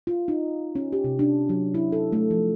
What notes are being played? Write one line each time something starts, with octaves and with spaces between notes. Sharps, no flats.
F4
D#4
C#4
G4
C3
D4
F#3
E4
A4
A3
F3